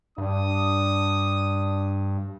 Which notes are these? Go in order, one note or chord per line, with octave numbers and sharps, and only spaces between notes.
G2 D4 D#6